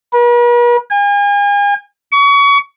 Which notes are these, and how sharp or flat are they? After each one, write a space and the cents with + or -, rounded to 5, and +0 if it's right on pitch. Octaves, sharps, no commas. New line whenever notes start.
B4 -45
G#5 -40
C#6 +30